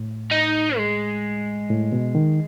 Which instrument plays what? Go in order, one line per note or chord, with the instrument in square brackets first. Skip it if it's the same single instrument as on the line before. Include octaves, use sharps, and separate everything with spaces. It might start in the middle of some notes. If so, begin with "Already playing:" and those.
Already playing: [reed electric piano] A2
[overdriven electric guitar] D#4
G#3
[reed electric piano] A2
B2
D#3